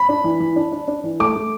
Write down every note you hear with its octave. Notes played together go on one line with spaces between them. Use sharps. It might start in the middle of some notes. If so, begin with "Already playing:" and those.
Already playing: B5
D4
E3
E3
D4
D4
D4
E3
A3 D6
A3